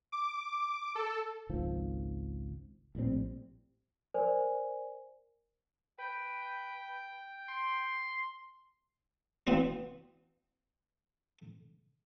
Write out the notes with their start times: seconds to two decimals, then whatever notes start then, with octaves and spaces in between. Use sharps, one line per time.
0.12 D6
0.95 A4
1.49 G#1 C#2 D#3 F3
2.95 A#1 A2 G3 C4
4.14 A#4 C5 D5 G#5
5.99 B4 G5
7.49 C6
9.47 E3 B3 C4 E4 F#4